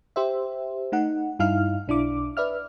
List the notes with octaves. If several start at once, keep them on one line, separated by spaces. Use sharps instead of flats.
G4 C5 E5
A3 D#4 F#5
G2 D#4 E4 F5 F6
B1 D4 E4 D6
B4 D5 E5 F6